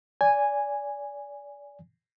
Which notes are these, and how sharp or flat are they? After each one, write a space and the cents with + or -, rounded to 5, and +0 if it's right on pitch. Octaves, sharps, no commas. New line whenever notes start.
D5 -25 G#5 -5